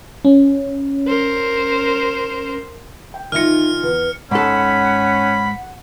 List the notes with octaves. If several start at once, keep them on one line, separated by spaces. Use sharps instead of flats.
C#4
A#4 C5
G5
D#3 D#4 F4 E5 G#5 F6 A#6 C#7
E2 B4
G#2 C#4 A4 F#5 B5